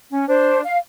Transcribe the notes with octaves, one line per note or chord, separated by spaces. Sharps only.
C#4
D4 C5
F5